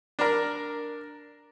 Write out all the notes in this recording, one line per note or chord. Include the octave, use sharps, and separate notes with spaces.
D4 A#4